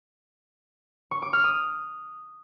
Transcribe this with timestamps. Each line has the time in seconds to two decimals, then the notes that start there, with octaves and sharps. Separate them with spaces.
1.11 C#6
1.22 D6
1.33 F6
1.44 D#6